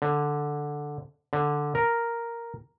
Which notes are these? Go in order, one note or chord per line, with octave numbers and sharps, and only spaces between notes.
D3
D3
A#4